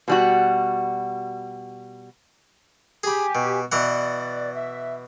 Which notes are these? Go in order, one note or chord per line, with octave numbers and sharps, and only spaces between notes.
B2 G3 F#4
G4 G#4 G#5 B5
B2
B2 E3 D5 F#5
E5